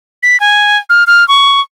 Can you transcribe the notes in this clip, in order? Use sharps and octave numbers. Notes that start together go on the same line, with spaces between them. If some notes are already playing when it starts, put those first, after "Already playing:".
B6
G#5
F6
F6
C#6